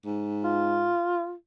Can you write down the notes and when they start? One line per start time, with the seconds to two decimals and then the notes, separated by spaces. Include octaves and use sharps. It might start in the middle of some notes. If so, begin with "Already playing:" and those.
0.06 G#2
0.45 F4